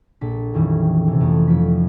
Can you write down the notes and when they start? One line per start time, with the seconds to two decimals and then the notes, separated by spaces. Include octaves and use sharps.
0.21 A#1 A4 B6
0.54 F2 D#3 E3 G3 C#4
1.08 C3 E3
1.20 F2 A3
1.47 F1 F3 F4 B6